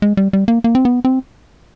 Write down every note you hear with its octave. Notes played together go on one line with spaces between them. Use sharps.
G#3
G3
G3
A#3
A#3
C4
B3
C4